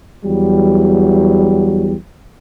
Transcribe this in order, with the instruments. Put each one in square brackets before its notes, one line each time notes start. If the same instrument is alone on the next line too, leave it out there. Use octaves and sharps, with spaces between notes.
[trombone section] E2 F#3 G3